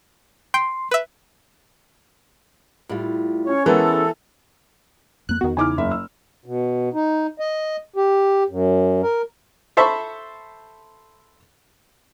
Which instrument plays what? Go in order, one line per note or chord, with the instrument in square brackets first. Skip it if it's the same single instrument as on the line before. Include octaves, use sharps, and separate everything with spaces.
[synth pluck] G5 [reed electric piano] C6
[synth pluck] B4 E5
[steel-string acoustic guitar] A2 G3 F4
[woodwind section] C#4 C#5
[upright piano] E3 B3 [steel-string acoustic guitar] G#3 C#4 A#4 [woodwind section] E4 A4
[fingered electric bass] F2 A#3 [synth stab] F#6
[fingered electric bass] E2 B3 [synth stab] D#3 F#4
[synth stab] C#3 D#4 E4 [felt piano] G#5 D6 F6
[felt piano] F#1 E5
E6
[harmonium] B2
D#4
D#5
G4
F#2
A#4
[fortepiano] A4 C5 E5 A5 B5 C#6